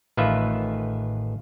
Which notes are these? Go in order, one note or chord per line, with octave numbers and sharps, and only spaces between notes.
A1 D#3 F4 B4 E5